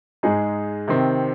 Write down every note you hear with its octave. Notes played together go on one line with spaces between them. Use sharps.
G#2 G#3 D#4 G#4
C3 D#3 C4